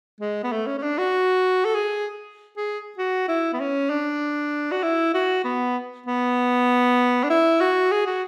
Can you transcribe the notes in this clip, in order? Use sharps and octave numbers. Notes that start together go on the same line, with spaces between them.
G#3
B3
A3
C#4
C#4
D4
F#4
A4
G#4
G#4
F#4
E4
B3
C#4
D4
F#4
E4
F#4
B3
B3
D4
E4
F#4
G#4
F#4